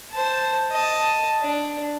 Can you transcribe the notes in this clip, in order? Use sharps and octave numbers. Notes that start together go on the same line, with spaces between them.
C5 A5
D#5 A5
D4